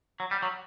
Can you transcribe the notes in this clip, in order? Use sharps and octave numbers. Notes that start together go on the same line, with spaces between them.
F#3
G3
F#3